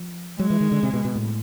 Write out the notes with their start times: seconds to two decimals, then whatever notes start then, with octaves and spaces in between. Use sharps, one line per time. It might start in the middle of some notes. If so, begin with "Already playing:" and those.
Already playing: F3
0.39 F#3 G#3
0.50 E3
0.61 D#3
0.72 D3
0.83 C3
0.94 B2
1.05 B2
1.15 A2